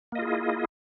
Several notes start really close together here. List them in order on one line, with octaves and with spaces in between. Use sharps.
A#3 D#5 F4 G#4 E4